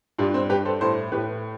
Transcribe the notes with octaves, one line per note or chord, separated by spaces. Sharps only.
G2 D4 F4
C4
G2 G4 B4
A4 C5
A2 A4 C5
A2 G4 B4